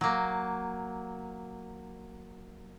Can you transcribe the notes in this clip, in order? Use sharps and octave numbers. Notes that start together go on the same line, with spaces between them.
F#3 A#3